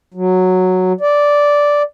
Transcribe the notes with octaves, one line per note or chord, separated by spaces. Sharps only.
F#3
D5